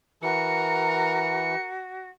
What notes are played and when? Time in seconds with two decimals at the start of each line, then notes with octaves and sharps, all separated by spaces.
0.22 E3 F#4 A#4 C#7